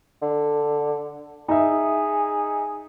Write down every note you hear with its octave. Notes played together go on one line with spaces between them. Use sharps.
D3
D#4 G#4 E5